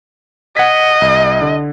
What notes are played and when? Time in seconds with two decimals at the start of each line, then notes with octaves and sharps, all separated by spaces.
0.57 D#5 F#5 G#6 B6
1.02 C2
1.42 D3